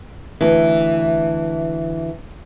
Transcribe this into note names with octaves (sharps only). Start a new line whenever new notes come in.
D2 E3